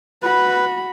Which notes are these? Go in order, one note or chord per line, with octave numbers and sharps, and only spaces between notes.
F#4 B4 B5